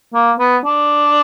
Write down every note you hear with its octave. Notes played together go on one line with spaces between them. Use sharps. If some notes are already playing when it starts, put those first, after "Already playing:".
A#3
B3
D4